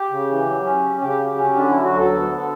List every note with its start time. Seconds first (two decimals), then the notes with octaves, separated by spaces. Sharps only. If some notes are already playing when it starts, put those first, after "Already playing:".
Already playing: G4
0.11 C#3
0.29 E3
0.46 F#3
0.64 C#4
0.83 C#3
1.01 C#3 G4
1.19 F#3
1.38 C#4
1.56 D3 D4
1.70 F#3 E4
1.84 F#4
1.92 D2 A4
2.10 B3
2.29 D3